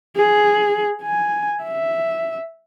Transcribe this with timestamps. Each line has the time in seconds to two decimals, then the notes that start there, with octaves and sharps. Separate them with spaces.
0.16 G#4
1.03 G#5
1.64 E5